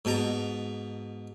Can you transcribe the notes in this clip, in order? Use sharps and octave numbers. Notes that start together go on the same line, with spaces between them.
G#2 B2 A5 A#5